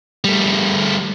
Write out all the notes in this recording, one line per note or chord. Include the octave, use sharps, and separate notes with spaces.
G3 A3